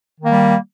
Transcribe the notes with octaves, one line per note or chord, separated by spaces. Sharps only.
D#3 G3 A#3